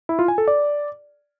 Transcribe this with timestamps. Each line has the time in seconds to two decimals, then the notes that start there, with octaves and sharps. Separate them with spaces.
0.09 E4
0.19 F4
0.28 G#5
0.38 A4
0.48 D5